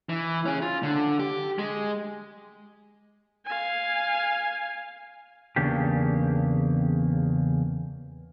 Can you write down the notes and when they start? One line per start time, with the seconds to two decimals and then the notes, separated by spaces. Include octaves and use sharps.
0.09 E3
0.46 C#4 G#4
0.62 F4
0.83 D3
1.20 G4
1.59 G#3
3.46 F5 G#5
5.56 E2 C#3 A#3 D4 G4